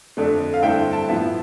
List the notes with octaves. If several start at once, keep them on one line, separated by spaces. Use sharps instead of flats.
F2 D3 A3 D4
F5
G2 D3 A3 C4 E4 G5
A5
A2 F3 B3 E4